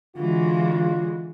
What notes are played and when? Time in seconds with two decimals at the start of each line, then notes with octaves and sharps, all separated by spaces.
0.17 D3 E3 G#3 F4 F#4